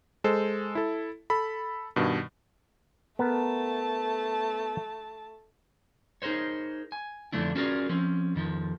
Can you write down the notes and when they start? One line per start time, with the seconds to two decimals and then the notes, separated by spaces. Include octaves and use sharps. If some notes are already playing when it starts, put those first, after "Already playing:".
0.24 G#3 A4 C5
0.75 E4 A4
1.30 A4 B5
1.96 G2 B2 D#3
3.19 A3 B3 A#4 A5
6.22 D#4 G#4 A#4 C5 C#5
6.92 G#5
7.32 F2 G#2 D3 A3 D4 E4
7.56 C#4 F4 F#4 G#4 A#4 D5
7.89 F3 C4 C#4
8.36 F2 D#3 F3